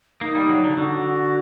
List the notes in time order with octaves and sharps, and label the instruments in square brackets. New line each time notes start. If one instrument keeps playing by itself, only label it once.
[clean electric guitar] A#3 [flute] D#4
[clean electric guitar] G3
F#3
[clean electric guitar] D3 [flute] D#4
[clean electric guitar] D3 [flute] F#4